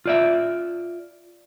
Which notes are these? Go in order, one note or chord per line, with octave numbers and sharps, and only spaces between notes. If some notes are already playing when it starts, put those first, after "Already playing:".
F4 D5 E5